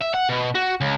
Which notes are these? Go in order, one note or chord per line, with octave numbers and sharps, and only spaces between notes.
E5
F#5
B2
F#4
C#2